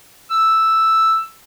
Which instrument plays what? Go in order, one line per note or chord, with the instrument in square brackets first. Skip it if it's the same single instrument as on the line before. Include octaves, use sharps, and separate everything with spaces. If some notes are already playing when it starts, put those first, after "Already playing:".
[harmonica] E6